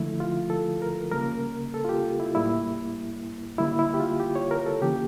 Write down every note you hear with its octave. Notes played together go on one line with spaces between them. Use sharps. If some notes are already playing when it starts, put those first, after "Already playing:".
Already playing: D3 F3 A3 E4
F4
A4
A#4
C#3 G3 A#3 A#4
A4
F4
G4
E4
A2 G3 A#3 E4
D3 G3 A#3 E4
E4
G4
F4
G4
C#5
A#4
A4
C#3 E3 A#3 G4